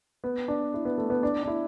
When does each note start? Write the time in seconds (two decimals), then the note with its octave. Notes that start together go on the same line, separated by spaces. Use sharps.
0.24 B3
0.48 D4
0.74 E4
0.85 B3
0.98 A3
1.10 B3
1.23 D4
1.43 D4
1.47 E4